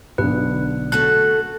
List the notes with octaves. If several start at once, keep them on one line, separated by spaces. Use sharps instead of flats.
B1 D3 B4
A3 F#4 A4 F#6